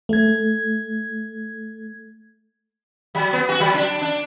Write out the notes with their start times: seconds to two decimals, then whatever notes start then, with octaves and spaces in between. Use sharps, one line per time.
0.09 A3 G#6
3.15 F#3
3.33 B3
3.49 F#4
3.60 F#3
3.74 D4
4.01 D4